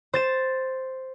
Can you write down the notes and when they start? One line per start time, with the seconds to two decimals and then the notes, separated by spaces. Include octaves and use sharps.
0.13 C5 A6 E7